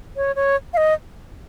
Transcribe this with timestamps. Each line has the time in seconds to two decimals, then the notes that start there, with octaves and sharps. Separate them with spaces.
0.16 C#5
0.36 C#5
0.73 F5
0.77 D#5